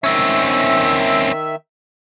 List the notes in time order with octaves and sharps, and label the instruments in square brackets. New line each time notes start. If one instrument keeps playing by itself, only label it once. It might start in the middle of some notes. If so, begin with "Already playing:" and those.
[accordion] D#3 E5 [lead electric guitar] C4 C#4